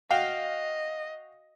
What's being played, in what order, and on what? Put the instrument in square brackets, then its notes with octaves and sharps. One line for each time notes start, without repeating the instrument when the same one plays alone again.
[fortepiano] F#4 F5 G5 [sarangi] D#5